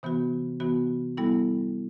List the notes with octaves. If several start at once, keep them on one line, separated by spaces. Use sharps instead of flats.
C3 E3 B3 F#4
C3 E3 B3 F#4
G3 B3 E4 A4